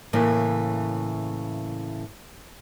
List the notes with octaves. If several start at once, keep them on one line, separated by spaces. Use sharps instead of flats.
A2 C#3 E3 A#3